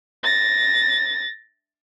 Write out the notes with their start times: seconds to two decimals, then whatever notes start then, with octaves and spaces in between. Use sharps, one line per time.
0.23 A6 A#6